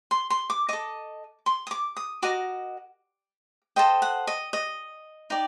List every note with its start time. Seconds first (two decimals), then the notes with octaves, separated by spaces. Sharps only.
0.11 C6
0.30 C6
0.50 D6
0.69 A4 D#5 D6
1.46 C6
1.67 D#6
1.71 D6
1.97 D#6
2.22 F#4 A#4 D#5 D6
3.76 A4 C5 D#5 G5
4.02 F#5
4.27 D#5
4.53 D#5
5.30 D#4 G4 D5